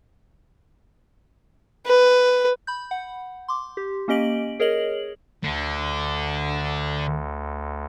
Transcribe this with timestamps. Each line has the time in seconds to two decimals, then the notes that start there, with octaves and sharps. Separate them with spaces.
1.86 B4
2.67 B5 G6
2.91 F#5
3.48 C6 D6
3.77 G4
4.08 A#3 C#4 G4 D#5 D7 F#7
4.60 G#4 A#4 C#5 D#5 F#7
5.44 D2 D3